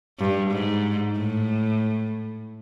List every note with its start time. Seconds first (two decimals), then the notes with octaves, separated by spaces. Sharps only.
0.19 G2
0.51 G#2
1.16 A2